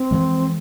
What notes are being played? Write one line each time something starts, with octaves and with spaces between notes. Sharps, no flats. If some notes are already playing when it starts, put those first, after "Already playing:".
Already playing: C4
F2 E3 G#3